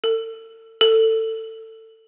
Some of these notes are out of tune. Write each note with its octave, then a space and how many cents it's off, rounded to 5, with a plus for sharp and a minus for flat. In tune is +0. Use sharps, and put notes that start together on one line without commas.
A4 +35
A4 +20